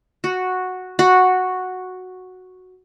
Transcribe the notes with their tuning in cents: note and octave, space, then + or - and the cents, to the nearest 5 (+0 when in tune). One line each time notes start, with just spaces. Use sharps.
F#4 -5
F#4 -5